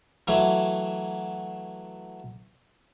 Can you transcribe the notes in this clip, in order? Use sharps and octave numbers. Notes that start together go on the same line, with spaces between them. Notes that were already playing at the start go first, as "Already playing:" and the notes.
E3 F#3 A3